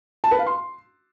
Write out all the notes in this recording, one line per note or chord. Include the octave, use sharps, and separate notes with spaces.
A5
B4
F5
C6